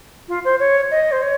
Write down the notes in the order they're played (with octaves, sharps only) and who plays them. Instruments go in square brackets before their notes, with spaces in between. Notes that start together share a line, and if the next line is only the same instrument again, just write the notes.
[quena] F4
C5
C#5
D#5
C5
C#5